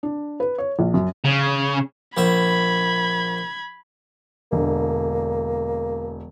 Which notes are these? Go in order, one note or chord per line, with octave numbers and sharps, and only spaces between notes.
D4
B4
C#5
A#1
F#2
C#3
A#1 E5 B5 G#6
E1 D3 A#3